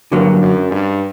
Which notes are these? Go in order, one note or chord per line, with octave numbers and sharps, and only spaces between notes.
G2 D3 F#3 A#3
F#2
G2